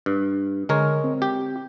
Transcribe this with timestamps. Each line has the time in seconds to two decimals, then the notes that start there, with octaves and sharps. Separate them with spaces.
0.06 G2
0.69 D3 G#3 A#4 C#5
1.04 C4
1.22 G4